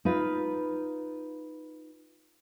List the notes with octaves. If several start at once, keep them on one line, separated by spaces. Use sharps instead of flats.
D#4 F4 B4